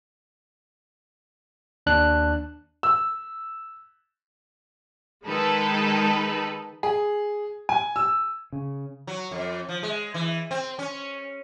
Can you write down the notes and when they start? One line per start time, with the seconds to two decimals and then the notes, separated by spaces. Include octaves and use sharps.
1.86 D#2 D4 F#6
2.83 E6
5.25 D#3 G#3 D#4 A4 B4
6.83 G#4
7.69 G#5
7.96 E6
8.52 C#3
9.07 F#3
9.31 F2
9.69 F3
9.83 G#3
10.14 E3
10.51 C4
10.79 C#4